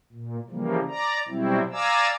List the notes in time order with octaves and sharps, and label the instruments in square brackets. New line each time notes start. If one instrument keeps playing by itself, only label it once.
[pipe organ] A#2
C#3 E3 F3 G3 A#3
D5 A#5
B2 F#3 G3 C4 E4
D5 F5 G#5 A#5 D6 E6